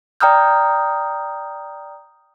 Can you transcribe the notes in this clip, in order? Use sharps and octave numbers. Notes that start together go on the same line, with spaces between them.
D5 G5 A#5 D#6 F6 G6